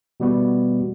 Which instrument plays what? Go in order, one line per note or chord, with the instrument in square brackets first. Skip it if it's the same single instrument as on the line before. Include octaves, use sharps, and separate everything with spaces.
[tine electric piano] B2 E3 G3 A3 B3 F#4